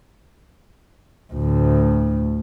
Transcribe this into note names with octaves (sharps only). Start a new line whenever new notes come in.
D2 A2